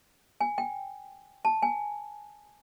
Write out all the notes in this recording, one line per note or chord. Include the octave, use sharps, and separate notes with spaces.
G#5
G5
A5
G#5